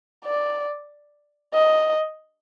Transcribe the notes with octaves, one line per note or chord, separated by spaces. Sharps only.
D5
D#5